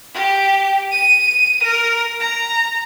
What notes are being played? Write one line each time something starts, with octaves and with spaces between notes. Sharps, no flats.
G4
D#7
A#4
A#5